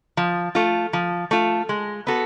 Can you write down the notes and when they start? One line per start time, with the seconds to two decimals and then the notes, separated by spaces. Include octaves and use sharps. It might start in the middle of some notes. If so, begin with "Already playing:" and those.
0.17 F3
0.55 A3 F4
0.93 F3
1.31 A3 F4
1.69 G#3
2.07 B3 F#4 A4